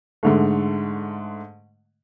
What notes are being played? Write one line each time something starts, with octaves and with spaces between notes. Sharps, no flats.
G#2 D3 A3